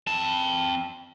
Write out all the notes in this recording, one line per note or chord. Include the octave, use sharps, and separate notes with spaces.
C4 A5